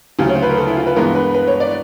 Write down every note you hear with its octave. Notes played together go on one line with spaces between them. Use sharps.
D2 C#3 F#3 G4
C#5
C5
B4
A#4
A4
E4
F4
B4
G2 E3 G#3 B3 A#4
B4
B4
C#5
D5